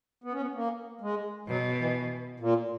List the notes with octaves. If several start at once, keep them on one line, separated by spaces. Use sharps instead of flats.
B3
C#4
B3
A#3
G#3
B2 F#3
E3
A#2